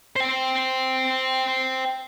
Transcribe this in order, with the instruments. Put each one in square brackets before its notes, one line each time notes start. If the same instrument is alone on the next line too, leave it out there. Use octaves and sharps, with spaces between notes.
[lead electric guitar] C5 G5